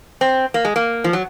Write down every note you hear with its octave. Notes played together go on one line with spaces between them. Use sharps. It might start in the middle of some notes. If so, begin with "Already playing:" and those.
C4
A#3
G#3
A#3
F3
F#3